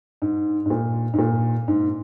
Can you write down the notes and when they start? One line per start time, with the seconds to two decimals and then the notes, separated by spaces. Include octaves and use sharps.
0.22 G#2
0.66 G#2
0.70 A#2
1.14 G#2
1.19 A#2
1.68 G#2